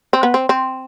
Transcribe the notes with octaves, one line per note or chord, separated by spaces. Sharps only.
C4
B3
C4
C4